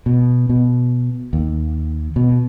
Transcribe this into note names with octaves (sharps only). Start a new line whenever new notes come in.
B2
B2
D#2
B2